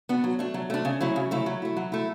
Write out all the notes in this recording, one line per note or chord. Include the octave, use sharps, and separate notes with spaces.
B3 D4 F#4
F#3
A3 D4
F#3
A3 D4
C#3
F#3 A3 E4
C#3
F#3 A3 E4
F#3
A3 E4
F#3
A3 E4